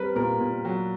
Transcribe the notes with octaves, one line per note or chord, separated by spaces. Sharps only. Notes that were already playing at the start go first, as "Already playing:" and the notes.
Already playing: G3 C4 A#4 B4
A#2 A#4
A#2
F#3